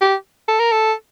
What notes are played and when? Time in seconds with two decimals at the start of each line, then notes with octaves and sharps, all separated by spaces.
0.01 G4
0.48 A4
0.60 A#4
0.72 A4